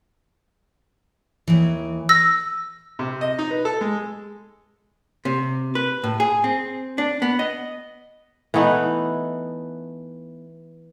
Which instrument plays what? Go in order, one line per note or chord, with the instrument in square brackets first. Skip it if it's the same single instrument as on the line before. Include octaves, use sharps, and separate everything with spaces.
[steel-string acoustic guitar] D#2 E3
[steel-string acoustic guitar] B4 [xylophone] E6 A#6
[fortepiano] C3
D#5
D#4
B4
A4
G#3
[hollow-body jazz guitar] C3
B4
A2
G#4
C4
D4
B3
D#5
[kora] E3 A3 B3 D#4